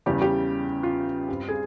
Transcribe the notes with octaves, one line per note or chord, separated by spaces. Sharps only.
E2 C#3 G3 G4
G4
F4
G2 G3 C4
G#4